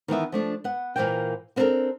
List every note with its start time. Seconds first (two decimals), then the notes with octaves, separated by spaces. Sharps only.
0.08 D#3 E3 B3 E5
0.32 F3 A3 D4
0.64 B3 F#5
0.96 A#2 E3 F#3 A#3 C5 G5
1.56 B3 C4 D4 E4 A4 A#4